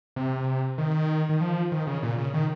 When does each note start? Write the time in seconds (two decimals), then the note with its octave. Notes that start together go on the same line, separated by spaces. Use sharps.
0.16 C3
0.78 D#3
1.29 D#3
1.41 F3
1.72 D#3
1.87 C#3
2.03 A#2
2.18 C#3
2.34 D#3